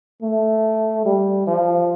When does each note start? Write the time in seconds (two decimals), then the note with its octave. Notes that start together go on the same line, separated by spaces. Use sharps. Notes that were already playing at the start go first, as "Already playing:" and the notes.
0.22 A3
1.05 G3
1.47 F3